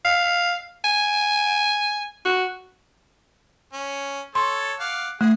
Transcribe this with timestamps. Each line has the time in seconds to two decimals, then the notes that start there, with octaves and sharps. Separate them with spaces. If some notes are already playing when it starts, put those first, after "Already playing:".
0.05 F5
0.84 G#5
2.25 F#4
3.74 C#4
4.35 A4 C#5 C6
4.80 F5 F#5 D6
5.21 A3 G#4